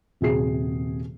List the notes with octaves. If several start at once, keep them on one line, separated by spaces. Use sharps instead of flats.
D#1 C3 F#4 G#4 C7